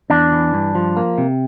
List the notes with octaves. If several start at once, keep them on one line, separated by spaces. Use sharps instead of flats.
E2 D4
E3
G2
F3
A#3
C3